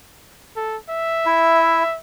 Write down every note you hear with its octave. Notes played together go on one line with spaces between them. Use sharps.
A4
E5
E4